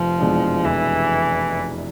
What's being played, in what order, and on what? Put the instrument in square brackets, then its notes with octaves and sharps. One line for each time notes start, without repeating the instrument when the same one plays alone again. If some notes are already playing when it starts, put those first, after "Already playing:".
Already playing: [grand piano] F1 [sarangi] F3
[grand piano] E2 B2 G#3 D4
[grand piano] F1 [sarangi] E3